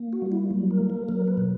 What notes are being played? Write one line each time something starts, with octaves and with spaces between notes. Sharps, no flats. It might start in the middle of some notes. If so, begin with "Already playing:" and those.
Already playing: A#3
F#4
G3
E4
F#3
A#4
A#3
A#4
F#3 A#4
B4
B2